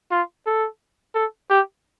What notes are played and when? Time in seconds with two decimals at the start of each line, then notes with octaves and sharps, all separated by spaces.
0.11 F4
0.46 A4
1.15 A4
1.50 G4